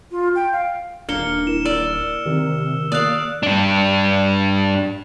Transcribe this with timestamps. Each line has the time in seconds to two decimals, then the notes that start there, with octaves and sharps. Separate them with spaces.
0.11 F4
0.35 G5
0.52 F5
1.09 D#1 A#3 D4 F6 C#7 G7
1.47 E4 A#4 E7
1.65 D5 E6
2.26 C3 D#3 G4 A#4
2.92 A#3 D5 F5 D#6 F#6
3.43 G2 D4